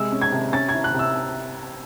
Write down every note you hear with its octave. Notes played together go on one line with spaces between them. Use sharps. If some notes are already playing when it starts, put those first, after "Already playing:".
Already playing: C3 G#3 E6
C#4
G#6
C3
C#4 A6
G#6
E4
F#6
C3
E6